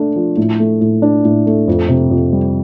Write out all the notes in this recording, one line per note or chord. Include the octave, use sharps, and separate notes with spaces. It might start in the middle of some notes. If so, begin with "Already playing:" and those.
Already playing: A3 D4
F3
A2
A3
A2
D4
A2
A3
F2
C3
F2
G3